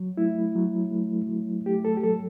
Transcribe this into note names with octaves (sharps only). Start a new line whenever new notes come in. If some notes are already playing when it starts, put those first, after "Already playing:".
Already playing: F#3
A3 E4
F#3
A3
F#3
A3 G4
A4
G4
F#3 A4